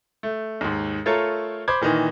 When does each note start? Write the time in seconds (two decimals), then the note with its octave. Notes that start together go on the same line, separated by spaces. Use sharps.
0.23 A3
0.61 D#2 G#2
1.06 A3 F4 A4 A#4 C#5
1.68 C5 B5 D6 G#6
1.81 A#2 D#3 E3 D#5